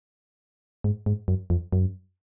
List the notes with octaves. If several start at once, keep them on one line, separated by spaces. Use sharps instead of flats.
G#2
G#2
F#2
F2
F#2